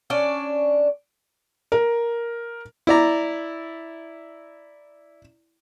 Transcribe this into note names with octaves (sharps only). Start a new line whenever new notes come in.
C#4 D4 D5
A#4
E4 D5 A#5